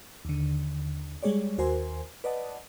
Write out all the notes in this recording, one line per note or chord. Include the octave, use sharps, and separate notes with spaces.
D#2 D3
G3 G#3 G#4 C#5 D5
D#2 F#4 A#4 C5 G#5 C6
B4 D5 D#5 F#5 A5